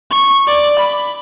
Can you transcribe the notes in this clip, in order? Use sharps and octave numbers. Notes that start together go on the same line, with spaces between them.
C#6
D5
B5